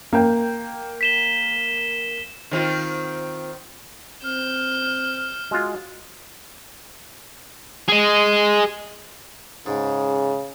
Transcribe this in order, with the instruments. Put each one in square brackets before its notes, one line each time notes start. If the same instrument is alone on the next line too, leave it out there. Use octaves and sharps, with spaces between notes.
[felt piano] A#3 G5
[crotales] B6 E7 G7
[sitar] D#3 C4 F4
[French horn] C4 [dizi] F6 [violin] G6 E7
[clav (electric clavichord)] G#3 F4 [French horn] F#4
[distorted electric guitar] G#4 D#5
[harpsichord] G#2 [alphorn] C#3